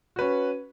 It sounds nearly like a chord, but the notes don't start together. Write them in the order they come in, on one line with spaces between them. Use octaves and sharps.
F#4 B4 C#4